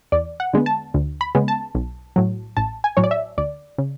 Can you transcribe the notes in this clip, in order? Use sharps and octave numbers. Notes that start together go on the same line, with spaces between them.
E2 D5
F#5
D3 G#3 B3
A5
D2
B5
C#3 G#3 B3
A5
B1
A2 F#3
A1 A5
G#5
A2 F#3 C#5
D5
E5
D2 D5
C#3